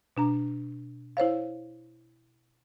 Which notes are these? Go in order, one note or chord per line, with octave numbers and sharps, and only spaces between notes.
B2 D4 A#5
E4 C5 C#5 F5